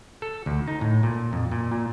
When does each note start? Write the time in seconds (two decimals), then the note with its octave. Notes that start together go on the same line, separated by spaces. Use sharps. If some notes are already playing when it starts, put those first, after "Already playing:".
0.22 A4
0.46 D2
0.68 D#4
0.81 A2
1.03 A#2
1.33 F2
1.51 A#2
1.71 A#2